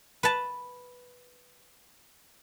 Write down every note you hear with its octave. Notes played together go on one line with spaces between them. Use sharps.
B4 A5